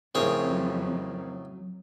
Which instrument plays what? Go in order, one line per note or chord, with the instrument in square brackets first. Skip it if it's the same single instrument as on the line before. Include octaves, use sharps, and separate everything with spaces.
[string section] F2 [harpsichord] A2 C#3 C#5 [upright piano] C4 G#4 A#4
[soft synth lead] F#3